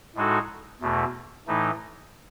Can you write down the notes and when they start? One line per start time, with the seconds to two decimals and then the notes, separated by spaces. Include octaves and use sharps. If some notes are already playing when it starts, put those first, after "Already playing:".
0.15 A2 G#3 D#4 F#4 A4
0.81 E2 B2 A3
1.47 A2 E3 A3 D#4